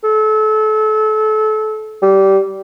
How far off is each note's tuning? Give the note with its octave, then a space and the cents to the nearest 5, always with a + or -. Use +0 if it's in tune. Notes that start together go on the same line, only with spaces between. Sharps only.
A4 -30
G3 -20